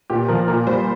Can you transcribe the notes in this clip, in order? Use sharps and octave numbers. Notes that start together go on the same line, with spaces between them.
A#2 G4
F3 A#4
A#2 A#4
G3 C5